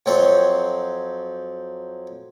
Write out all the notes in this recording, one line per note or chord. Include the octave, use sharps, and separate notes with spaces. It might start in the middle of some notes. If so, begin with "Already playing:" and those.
F2 F#3 C4 C#5